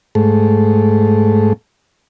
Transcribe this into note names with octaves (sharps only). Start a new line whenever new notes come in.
G#2 A3